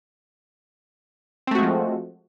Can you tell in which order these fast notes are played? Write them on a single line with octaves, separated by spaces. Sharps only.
C4 A3 F#4 G#3 F3